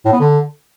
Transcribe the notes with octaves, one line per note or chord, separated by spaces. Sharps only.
A2
B3
D3